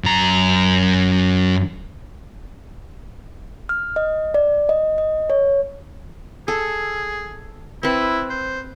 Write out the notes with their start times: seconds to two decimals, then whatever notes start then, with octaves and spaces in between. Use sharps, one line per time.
0.04 F#2 A#5
3.69 F6
3.96 D#5
4.34 D5
4.69 D#5
4.98 D#5
5.30 C#5
6.48 G#4 A4
7.83 C4 E4 B4
8.30 C5